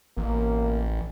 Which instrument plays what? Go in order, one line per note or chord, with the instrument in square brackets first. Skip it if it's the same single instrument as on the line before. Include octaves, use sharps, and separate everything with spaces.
[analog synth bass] A1 [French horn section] B2 A#3